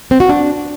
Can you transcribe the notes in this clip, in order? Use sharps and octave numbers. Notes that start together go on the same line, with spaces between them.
C4
F#4
D4